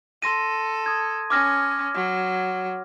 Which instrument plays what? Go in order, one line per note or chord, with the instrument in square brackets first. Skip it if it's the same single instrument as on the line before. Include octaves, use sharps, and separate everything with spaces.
[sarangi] A4 [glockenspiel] C6 A#6 D#7
[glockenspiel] D#6 G#6
[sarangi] C#4 [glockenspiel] D6 F6 A#6
[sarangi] F#3